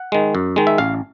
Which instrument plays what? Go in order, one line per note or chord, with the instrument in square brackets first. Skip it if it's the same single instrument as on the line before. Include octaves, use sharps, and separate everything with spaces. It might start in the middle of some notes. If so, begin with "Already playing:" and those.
Already playing: [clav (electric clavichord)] F#5
D#3 G#3
F#2
D#3 G#3
E5
A1 F5